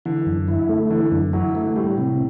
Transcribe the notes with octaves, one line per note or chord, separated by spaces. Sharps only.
D3 E3
F#2
E4
D3
A3
D3 E3
F#2 D3
F#3 E4
E3 A3
A2 G3
C3